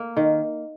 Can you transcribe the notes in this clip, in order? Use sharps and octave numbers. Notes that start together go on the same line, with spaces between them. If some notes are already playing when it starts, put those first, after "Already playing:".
Already playing: A#3
D#3